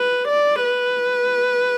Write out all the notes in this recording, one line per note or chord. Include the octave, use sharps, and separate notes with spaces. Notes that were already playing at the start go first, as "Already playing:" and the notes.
Already playing: B4
D5
B4